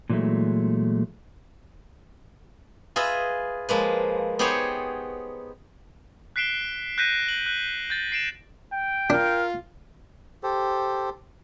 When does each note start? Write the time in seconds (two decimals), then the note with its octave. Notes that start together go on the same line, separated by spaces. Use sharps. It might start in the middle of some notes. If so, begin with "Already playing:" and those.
0.10 A#2 E3 F#3 G#3 A3
2.96 F4 G#4 B4 D#5 E5
3.69 F3 G#3 A#3 B4
4.39 B3 D#4 G4 G#4 C5 C#5
6.36 F#6 B6 C7 D7 E7 G7
6.98 F#6 G6 A#6 B6 D#7
7.28 F#7
7.46 F#6
7.90 G6 A6
8.12 C7 D7 E7
8.73 G5
9.10 D4 F4 A#4
10.43 G4 A4 C5